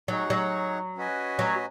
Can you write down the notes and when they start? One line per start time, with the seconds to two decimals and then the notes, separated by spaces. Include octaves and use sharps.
0.08 F#3 D#4 G#4 C#5 F#5
0.30 F#3
0.96 C#4 F#4 B4 D#5 G#5
1.39 F#3